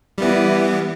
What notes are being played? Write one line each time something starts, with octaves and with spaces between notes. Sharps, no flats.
E3 G3 B3